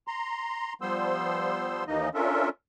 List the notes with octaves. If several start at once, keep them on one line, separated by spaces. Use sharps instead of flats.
A#5 C6
F3 G3 B3 C5 C6 E6
D#2 E3 A#3 D#4 D#5
C#4 D4 F4 A4 A#4 E5